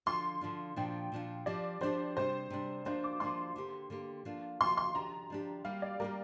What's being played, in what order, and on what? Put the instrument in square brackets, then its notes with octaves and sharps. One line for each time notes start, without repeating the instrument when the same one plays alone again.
[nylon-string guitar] D3 F3 D4 F4 [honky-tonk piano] C6
[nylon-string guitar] D3 F3 D4 F4
[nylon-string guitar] A#2 F3 D4 F4 [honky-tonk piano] G5
[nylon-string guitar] A#2 F3 D4 F4
[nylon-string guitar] F3 D4 G4 [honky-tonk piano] D5
[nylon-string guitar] F3 D4 G4 [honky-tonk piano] C5
[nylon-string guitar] C3 G3 D4 [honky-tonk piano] C5
[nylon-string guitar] C3 G3 D4
[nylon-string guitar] F3 A#3 D4 F4 [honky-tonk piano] C5
[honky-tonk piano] D6
[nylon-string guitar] F3 A#3 D4 F4 [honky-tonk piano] C6
[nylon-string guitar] D3 A#3 G4
D3 A#3 G4
F3 A#3 D4 F4
[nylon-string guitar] F3 A#3 D4 F4 [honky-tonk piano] C6
[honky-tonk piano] C6
[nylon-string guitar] F3 D4 G4 [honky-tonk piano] A#5
[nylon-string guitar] F3 D4 G4
[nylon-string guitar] G3 A#3 G4 [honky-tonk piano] F5
[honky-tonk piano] D5
[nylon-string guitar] G3 A#3 G4 [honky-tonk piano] A#4